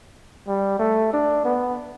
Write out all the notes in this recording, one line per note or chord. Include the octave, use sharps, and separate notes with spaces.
G3
A3
D4
B3